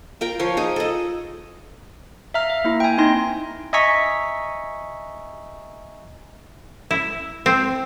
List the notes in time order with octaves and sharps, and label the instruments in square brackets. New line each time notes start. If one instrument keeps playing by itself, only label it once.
[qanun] F4 A#4 G5
F3 C#5 C6
D#4 G#4
A4 D#5
[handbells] E5 F5 A#5 F6
E5
A#3 E4
G5 G#5
A#3 C4 D#4 C6 A#6
[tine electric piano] D#5 E5 G#5 A#5 C#6 B6
[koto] E4
C4